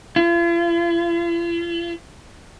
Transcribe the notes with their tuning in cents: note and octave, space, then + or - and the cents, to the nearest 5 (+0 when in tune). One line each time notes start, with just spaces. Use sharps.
F4 -45